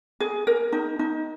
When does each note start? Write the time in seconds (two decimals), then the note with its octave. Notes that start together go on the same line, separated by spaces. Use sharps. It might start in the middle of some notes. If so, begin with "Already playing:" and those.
0.20 G#4
0.47 A#4
0.73 D#4
0.99 D#4